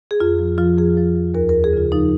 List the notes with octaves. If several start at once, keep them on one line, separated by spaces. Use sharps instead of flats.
G#4
F2 F4
F3
F3 F4
F2 G#4
F3
F3
D#2 A#4
F3 A#4
G#4
C#3 F4
F3 D#4